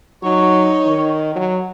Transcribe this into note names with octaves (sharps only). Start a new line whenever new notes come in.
F#3 D#4 C#5
D#3
F#3